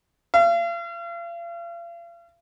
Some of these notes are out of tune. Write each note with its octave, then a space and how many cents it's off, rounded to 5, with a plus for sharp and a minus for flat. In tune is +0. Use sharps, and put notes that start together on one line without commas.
F5 -40